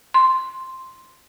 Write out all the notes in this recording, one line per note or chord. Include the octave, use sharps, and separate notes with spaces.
C6